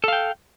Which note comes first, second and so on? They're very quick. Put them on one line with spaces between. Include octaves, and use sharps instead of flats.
A4 F5 G5